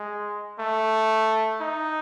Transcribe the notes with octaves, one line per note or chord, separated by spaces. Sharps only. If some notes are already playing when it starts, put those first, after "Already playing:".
Already playing: G#3
A3
D#4